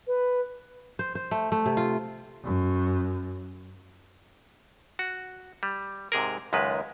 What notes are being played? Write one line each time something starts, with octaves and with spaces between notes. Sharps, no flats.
B4
C5
C5
A3
A3
C3
F4
F#2
F#4
G3
G#2 C3 G#4 A#4
C#2 F#2 D#3 G#3 B4